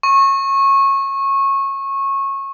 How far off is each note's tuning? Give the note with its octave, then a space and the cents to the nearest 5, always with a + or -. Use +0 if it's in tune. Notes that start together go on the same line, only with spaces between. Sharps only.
C#6 -20